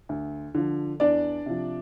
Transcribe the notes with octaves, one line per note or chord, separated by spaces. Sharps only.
D2
D3 F3
E2 D4 D5
C3 F3